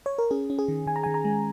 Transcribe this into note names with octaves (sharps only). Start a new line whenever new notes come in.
C#5
A#4
C#4 G#4
C#4
G#4
D#3
D#3 G#5
A#5
G#5
D#3
A#5
G#3